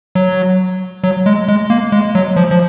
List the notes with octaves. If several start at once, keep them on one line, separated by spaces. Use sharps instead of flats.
F#3
F#3
G#3
G#3
A#3
G#3
F#3
F3
F3